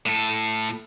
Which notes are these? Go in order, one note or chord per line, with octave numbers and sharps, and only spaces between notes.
A2 A4